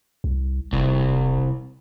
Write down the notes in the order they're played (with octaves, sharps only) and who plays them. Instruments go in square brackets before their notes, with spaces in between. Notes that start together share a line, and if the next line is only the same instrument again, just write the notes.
[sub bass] C2
[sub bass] E1 [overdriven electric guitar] C2